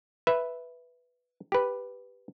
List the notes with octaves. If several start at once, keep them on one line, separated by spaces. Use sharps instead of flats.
B4 E5
G4 B4